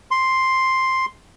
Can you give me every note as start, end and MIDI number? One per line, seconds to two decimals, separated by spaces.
0.11 1.06 84